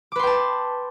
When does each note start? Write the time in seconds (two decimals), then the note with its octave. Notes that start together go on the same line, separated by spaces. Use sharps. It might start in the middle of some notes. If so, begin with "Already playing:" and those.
0.12 D6
0.16 B4
0.19 C6
0.23 G5
0.27 A5